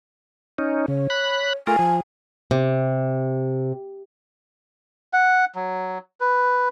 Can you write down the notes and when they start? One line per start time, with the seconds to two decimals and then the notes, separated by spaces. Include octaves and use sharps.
0.58 C#4 D#4
0.88 C#3 C#5
1.10 B5 F#6
1.67 A3 F4 A#4 G#5
1.79 F3
2.51 C3
5.13 F#5
5.55 F#3
6.20 B4